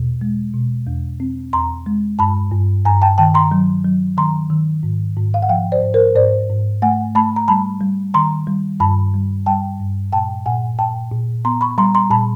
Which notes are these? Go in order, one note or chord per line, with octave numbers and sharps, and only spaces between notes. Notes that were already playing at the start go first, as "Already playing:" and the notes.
Already playing: E2 B2
G#3
B2
E2
C4
E2 A#5 C6
G#3
G2 A5 B5
G2
G2 G#5 A#5
G5 A5
D#3 G5 A5
A#5 C6
F#3
F#3
D#3 A#5 C6
D#3
G#2
G#2
F5
F#5
F3 F5 G5
C5 D5
G#2
A#4 C5
G#2 C5 D5
G#2
A3 F#5 G#5
A3 A5 B5
A#5
G3 A5 B5
G3
D#3 A#5 C6
G3
G2 A5 B5
G3
G3 G5 A5
G2
A#2 G5 A5
A#2 F#5 G#5
A#2 G5 A5
A#2
B3 A#5 C6
B5 C#6
G3 A#5 C6
A#5 C6
A#2 A5 B5